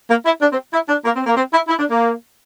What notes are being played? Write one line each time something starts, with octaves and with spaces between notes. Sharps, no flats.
A#3
E4
D4
C4
E4
D4
A#3
C4
A#3
C4
E4
E4
D4
A#3